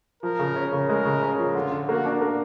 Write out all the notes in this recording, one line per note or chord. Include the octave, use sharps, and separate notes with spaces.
F3 A#4
C#3
C#4
C#3
G#3 A#4
C#3
C#4
F3
D3 F4
D3
A#3 F#4
D4
A#3